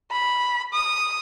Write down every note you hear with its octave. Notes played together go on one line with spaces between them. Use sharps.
B5
D#6